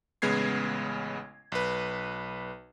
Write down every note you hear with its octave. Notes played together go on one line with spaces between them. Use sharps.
A1 C#3 G#3 B3 G#6 C7
B1 B4